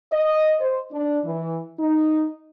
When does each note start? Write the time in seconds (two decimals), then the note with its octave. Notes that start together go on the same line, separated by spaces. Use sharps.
0.13 D#5
0.61 C5
0.92 D4
1.25 E3
1.79 D#4